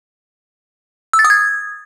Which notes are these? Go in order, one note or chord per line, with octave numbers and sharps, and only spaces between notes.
E6
A6
D#6
G#6